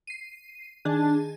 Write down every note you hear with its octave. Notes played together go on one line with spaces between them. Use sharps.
C7 D#7
D#3 D4 G#4 A5